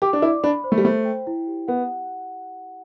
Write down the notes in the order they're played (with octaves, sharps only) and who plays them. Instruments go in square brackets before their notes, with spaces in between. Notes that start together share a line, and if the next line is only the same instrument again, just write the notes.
[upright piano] G4 [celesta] D6
[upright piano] D4
[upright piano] E4 [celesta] D5
[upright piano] D4 [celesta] B5
[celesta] C5
[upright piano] A3
G3
[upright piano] A3 [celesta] C5
[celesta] G5
E4
G4
[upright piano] B3 [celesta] F#5